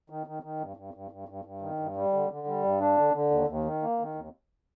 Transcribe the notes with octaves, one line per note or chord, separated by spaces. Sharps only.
D#3
D#3
D#3
G2
G2
G2
G2
G2
G2
D#3
G2
G3
D3
D3
G3
G2
D4
D3
D3
D#2
D#2
D#3
A#3
D#3
D#2